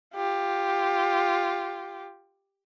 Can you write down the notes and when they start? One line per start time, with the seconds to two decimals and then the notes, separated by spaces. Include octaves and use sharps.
0.15 F4 G4